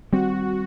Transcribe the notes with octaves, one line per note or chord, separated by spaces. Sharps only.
D#3 G3 C4 F#4